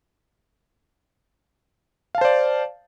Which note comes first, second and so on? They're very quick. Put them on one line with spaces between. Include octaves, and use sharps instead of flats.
F5 A5 C5 D5